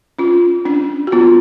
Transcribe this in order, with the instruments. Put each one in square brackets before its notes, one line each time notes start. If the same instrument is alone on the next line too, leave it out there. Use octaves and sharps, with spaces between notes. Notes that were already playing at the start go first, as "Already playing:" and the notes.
[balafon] C#4 F4
C#4 D4
F#4
B3 F4